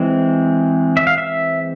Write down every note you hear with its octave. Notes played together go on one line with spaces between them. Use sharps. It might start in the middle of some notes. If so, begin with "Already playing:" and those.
Already playing: E3 G#3 C4
E5
F5
E5